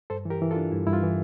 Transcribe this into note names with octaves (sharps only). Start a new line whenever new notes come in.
G2 A4 C5
E3 G4 A#4
E3
F4 A4
D4
G2 E4
G2 E4
F4
E3